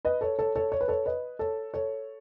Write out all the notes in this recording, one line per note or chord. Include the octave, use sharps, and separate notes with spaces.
B4 D#5
A4 C#5
A4 C#5
A4 C#5
C#5
B4
A4 C#5
B4 D#5
A4 C#5
A4 C#5